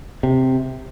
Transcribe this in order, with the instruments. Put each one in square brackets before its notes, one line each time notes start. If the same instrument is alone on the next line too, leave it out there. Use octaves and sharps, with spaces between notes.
[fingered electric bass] C3